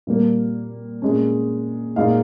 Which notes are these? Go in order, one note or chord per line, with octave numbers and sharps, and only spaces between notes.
A#2 G3 A#3
A#2 G#3 C#4
A#2 G#3 D#4 F5